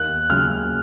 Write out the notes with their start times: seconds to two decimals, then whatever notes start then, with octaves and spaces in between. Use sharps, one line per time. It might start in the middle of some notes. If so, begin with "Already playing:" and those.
Already playing: D#2 F#6
0.30 C#3 F#3 F6